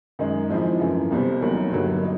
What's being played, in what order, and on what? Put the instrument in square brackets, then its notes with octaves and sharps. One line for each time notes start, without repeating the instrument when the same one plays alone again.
[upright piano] F#2 D#3 G#3
G#2 F3 G#3 C4 E4
F#2 C#3 E3 A3
C2 B2 G3 C4
E1 D#2 D#3 F#3
G2 D3 F#3 A#3
D#4